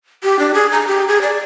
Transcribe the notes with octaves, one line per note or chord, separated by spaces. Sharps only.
G4
D4
G#4
A#5
G4
G#4
D5